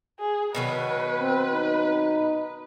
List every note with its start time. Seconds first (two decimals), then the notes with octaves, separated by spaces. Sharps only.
0.19 G#4
0.55 B2 D#3 F#3 B4
1.20 C4
1.54 D#4